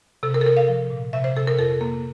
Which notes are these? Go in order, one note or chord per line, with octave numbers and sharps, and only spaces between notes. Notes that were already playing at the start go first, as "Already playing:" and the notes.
C3 A4
A#4
A4
C3 A#4
F5
F3
A#2
C3 E5
C5
C3 A4
A#4
F2 A4
A#3